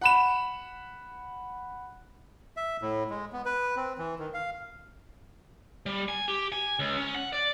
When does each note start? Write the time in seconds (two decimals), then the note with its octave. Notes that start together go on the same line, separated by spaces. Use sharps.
0.01 F#5 B5 E7
2.57 E5
2.82 A2
3.10 G#3
3.33 B3
3.46 B4
3.77 C4
3.99 E3
4.19 D#3
4.34 F5
5.86 G3
6.08 G#5
6.28 G4
6.52 G#5
6.79 C#2
6.97 C#4
7.15 F#5
7.33 D5